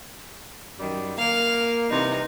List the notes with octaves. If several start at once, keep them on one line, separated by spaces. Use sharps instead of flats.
F#2 D#3 G3
A#3 F5
C3 E3 G3 D#4